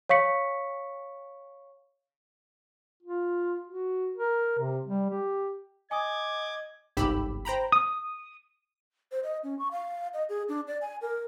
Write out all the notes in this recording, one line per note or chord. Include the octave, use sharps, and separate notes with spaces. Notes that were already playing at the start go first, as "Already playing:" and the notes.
C#5 F5 C#6 B6 C#7
F4
F#4
A#4
C3
G3
G4
D#5 G#5 D6 D#6 G#6
G1 C2 G#2 G4 B5 E6
C5 G5 A#5 B5
D#6
C5
D#5
C#4
C#6
F5
D#5
G#4
D4
D5
G#5
A#4